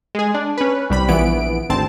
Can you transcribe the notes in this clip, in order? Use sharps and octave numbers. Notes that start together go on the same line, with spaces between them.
G#3 G#4
D4
C#4 B4
C2 G3 B5
A#1 E3 B3 D7
G#1 D2 C4 A5